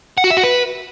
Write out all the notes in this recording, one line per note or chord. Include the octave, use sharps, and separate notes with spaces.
F#5
F#4
E5
F#4
B4